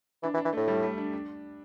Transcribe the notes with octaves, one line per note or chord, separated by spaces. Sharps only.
E3 D4
E3
D4
E3
A2 A3
G3
A3
D4
D4